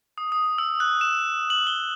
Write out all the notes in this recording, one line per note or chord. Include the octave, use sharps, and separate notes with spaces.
D#6
D#6
E6
F#6
E7
F#7
G7